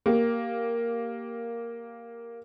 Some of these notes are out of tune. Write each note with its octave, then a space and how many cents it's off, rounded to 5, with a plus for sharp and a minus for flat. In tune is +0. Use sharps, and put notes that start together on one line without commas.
A#3 +0 G4 +0